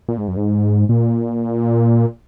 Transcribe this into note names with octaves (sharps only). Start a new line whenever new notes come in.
A#2
G#2
F#2
G#2
A#2